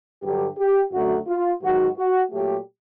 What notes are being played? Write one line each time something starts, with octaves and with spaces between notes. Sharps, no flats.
G2 D3 F#3 G4
G4
F#2 D3 F#3 A3 F#4
F4
G#2 D#3 F#3 F#4
F#4
A#2 F#3 A3 G4